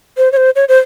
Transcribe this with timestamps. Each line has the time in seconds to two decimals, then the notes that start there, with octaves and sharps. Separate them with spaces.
0.18 C5
0.32 C#5
0.37 C5
0.56 C#5
0.69 C5